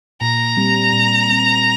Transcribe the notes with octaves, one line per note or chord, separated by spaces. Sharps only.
A#2 A#5
G3 C4
A#2
G3 C4